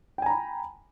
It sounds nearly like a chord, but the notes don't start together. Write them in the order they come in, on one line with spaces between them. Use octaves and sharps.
G5 G#5 A#5 B5